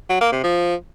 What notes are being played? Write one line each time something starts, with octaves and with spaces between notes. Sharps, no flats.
F#3
A#3
C3
F3